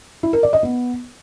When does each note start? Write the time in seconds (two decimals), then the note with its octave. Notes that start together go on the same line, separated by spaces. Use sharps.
0.23 E4
0.33 A#4
0.43 D5
0.53 D#5
0.63 B3